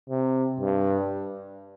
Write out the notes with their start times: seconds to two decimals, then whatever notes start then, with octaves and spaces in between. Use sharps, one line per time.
0.09 C3
0.60 G2